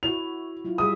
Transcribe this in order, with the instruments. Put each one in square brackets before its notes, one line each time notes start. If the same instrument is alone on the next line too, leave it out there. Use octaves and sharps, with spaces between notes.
[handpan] E4 F#4 C#5 [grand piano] F7
[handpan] F#3 E4 F4
[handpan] G3 G#4 E5 [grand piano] D#6